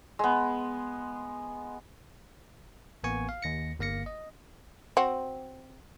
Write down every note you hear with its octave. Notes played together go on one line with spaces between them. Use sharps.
G#3 B3
A1 A#3 B3 G#5 C#6
F5
D#2 A#6 C#7
G1 A#3 F5 A#6 C#7
D#5
C4 F#4